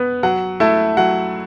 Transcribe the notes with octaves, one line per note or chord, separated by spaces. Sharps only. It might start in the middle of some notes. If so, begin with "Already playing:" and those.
Already playing: B3 B4
F#3 F#5
A3 E4 A5
F#3 F#5